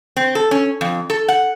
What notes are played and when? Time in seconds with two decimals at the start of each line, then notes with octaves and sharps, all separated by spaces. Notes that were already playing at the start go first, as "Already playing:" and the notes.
0.17 C4
0.35 A4
0.51 C#4
0.81 F2
1.10 A4
1.28 F#5